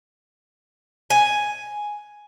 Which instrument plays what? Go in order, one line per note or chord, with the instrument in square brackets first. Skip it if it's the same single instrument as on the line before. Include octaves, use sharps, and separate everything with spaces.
[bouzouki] G#5